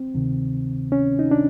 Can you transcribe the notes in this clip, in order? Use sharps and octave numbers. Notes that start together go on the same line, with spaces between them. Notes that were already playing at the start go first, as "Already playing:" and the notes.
Already playing: C4
D2 C3 D#3
C#4
D#4
D4